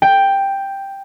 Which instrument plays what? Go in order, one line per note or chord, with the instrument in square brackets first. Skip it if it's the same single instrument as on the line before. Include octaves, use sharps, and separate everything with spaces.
[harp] G5